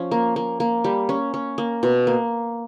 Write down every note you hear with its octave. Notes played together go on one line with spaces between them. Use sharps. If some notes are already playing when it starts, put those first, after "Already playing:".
Already playing: F3 C#4
A#3
A#3
A#3
G3
C#4
C#4
A#3
B2
A#3